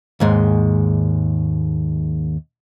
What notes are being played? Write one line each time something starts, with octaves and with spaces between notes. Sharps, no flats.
D#2 G#2 G#3